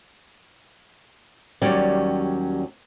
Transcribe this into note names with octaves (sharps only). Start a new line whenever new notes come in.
D#2 F#3 G3 C#4 D5